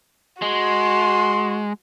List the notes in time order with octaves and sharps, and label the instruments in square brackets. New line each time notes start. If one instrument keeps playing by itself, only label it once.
[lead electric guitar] G#3 [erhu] F#4 [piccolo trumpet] C6